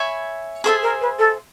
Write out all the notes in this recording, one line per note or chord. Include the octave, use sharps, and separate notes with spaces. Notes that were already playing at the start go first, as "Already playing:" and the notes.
Already playing: C#5 E5 G#5 B5
G#4 A4 C5 E5 G#5
A#4
B4
A4